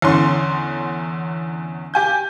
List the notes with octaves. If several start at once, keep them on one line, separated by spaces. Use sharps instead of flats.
E2 D3 C#4 C6
G4 G#5 G6